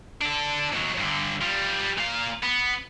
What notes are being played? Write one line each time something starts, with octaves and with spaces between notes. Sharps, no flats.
D4 A4
D#2 F#3
G2 D3
G3 F4
A#2 F5
B3